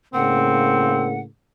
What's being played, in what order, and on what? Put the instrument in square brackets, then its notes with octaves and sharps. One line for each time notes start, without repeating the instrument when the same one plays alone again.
[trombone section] A2 C#3 A#3 [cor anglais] C4 [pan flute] F#5